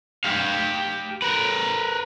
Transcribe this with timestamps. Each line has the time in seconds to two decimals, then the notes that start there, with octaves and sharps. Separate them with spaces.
0.24 G4 F5
1.22 A#4 B4